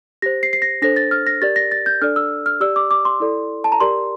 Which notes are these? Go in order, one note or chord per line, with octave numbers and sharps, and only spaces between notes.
G4 C5 A#6
C7
C7
A#6
D4 A4 C5 A#6
A6
F6
A#6
G4 A#4 D5 A6
A#6
A6
G6
D4 A4 D5 F6
E6
F6
G4 D5 E6
D6
D6
C6
E4 A4 D5
A5
A#5
G4 A#4 D5 C6